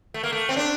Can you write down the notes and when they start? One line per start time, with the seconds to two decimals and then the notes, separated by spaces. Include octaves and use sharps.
0.14 A3
0.23 A#3
0.33 A3
0.49 C4
0.56 D4